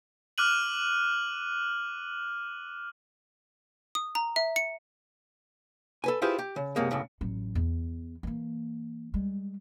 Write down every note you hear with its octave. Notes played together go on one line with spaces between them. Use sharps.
D6 F6 F#6 D#7 F#7
D#6
A#5
E5
C#7
A4 B4 G#5
E4 F4 G4 G#4 B4 C5
G4
C#3
F#2 C3 G#3 A#3
B1 F#2 A2 C#3
A1 F#3
E2
E3 A#3
G3 G#3